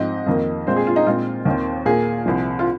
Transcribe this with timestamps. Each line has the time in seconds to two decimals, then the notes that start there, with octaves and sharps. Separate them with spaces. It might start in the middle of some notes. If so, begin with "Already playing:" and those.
Already playing: G#2 F3 C4 D#5
0.26 F2 D#3 A#3
0.67 A#2 G#3 C4 C5
0.76 G#4
0.87 F4
0.96 D#4
1.07 A#2 G#3 C4 F4
1.45 D#2 D#3 C4
1.86 A#2 A#3 G#4
2.25 C2 C3 F3 C4
2.59 F4